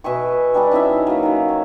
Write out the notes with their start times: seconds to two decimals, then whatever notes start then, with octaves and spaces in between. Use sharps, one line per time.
0.04 B2 E5 G#5 C#6
0.54 G3 D4 G#4
0.71 C#4 D#4 E4 E5
1.07 F#3 A#3
1.23 D#3 A#3
1.49 C#5